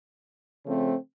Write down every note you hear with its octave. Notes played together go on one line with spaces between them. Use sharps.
C#3 F3 A3 C4